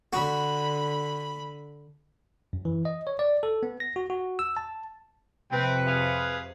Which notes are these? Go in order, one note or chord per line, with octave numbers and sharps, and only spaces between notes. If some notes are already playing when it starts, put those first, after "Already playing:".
D3 F#4 B5
F#2
E3
D#5
C#5
D5
A4
B3
A#6
F#4
F#4
E6
A5
F2 C3 C4 B4 G5
G#4 F5